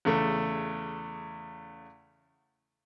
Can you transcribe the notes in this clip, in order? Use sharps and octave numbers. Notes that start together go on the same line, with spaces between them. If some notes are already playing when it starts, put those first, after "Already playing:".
E2 C#3 A3